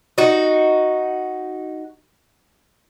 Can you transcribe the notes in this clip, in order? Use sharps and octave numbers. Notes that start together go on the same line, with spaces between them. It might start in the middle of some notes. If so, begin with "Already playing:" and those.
D#4 F#4